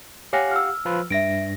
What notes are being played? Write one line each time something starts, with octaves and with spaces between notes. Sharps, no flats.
G4 C#5 F5 F#5 G#5 A#6
E6 F6
F3 F4 B4
G2 E5 A#6 D7